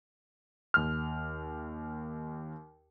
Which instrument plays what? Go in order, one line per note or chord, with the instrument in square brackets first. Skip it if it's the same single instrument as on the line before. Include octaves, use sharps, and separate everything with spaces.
[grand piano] D#2 F6